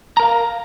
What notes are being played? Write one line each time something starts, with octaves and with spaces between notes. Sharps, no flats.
A#4 F5 A#5